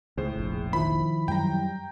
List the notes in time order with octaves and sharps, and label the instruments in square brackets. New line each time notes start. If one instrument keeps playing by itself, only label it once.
[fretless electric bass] C#2 [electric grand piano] A2 C5 [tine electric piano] G#4
[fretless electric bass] F1 A#1
[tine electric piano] D#3 F3 E4 [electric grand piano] B5
[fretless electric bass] F#2 F#3 G3 [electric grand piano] G5 A#5